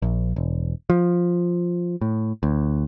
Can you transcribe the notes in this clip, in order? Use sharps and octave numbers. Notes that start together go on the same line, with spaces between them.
A#1
E1
F3
A2
D2